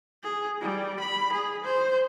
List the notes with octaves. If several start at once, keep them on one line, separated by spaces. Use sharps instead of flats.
G#4
G3
B5
G#4
C5